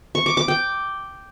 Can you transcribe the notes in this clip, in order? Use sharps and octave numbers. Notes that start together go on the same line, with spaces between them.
C#6
D6
D6
G5